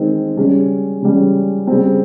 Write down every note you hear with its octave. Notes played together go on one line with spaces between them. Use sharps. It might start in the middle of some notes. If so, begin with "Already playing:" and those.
Already playing: D#3 G#3 C4
C#3 G3 C#4
C#3 G3 C#4
C#3 G3 C4